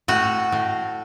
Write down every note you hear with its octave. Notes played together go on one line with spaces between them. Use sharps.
A2 F#4
A2